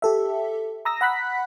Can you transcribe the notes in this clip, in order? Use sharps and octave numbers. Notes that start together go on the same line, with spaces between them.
G4 A4 E5
A#5 D#6 E6 A#6
F#5 B5 F#6 B6